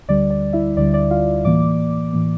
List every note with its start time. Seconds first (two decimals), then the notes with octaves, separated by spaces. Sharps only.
0.08 D2 D3 G3 D5
0.31 D5
0.53 E4 E5
0.77 D2 D3 G3 D5
0.94 D5
1.11 F4 F5
1.45 A2 E3 A#3 D5 D6
2.13 A2 E3 A#3